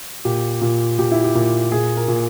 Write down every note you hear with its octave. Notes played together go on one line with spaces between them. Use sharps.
A#2 G4
A#2
A#2 G4
E4
G4
A#2
A#2 G#4
A#4
A#2